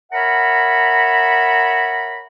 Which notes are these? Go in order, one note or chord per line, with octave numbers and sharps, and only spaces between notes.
A#4 C#5 E5 F#5 A#5 B5